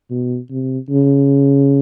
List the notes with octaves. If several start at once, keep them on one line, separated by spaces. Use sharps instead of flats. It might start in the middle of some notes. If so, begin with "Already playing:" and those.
B2
C3
C#3